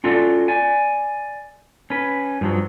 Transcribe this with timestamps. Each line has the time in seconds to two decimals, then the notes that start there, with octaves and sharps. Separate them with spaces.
0.04 C#4 F4 F#4 A4 D5
0.48 D5 G#5
1.90 C#4 B4
2.41 G2 F3 F#3